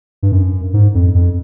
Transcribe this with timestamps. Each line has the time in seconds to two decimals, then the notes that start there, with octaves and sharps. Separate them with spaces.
0.23 G2
0.32 F#2
0.74 G#2
0.95 F2
1.15 F2